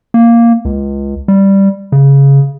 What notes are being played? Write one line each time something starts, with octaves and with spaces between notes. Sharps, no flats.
A#3
C#2
G3
C#3